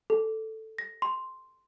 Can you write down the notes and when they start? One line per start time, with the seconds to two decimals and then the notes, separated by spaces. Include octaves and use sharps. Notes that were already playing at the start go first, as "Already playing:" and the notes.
0.10 A4
0.78 A#6
1.02 C6